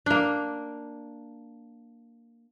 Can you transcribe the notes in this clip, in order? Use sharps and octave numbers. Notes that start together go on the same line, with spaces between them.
A#3 D4